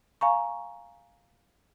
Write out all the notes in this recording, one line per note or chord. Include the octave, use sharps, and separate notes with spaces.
F5 G#5 A#5 C#6